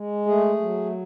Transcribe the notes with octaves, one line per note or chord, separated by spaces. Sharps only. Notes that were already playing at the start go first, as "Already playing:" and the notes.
Already playing: G#3
A3 G#4
F#3